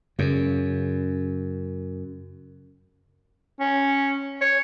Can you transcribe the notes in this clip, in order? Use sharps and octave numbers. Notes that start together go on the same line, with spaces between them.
F#2 C#3
C#4
C#5